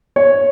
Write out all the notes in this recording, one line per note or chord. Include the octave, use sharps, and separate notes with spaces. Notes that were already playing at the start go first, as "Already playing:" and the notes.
C#5